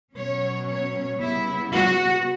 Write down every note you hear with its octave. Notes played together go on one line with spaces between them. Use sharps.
B2 F#3 C#4 C#5
C#5
C#3 G3 B3 E4
F#4